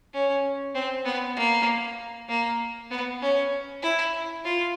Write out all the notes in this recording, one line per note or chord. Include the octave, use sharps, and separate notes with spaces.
C#4
C4
B3
A#3
A#3
B3
C#4
E4
F4